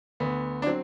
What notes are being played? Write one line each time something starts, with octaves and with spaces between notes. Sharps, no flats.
D2 B3
D4
F#3 C4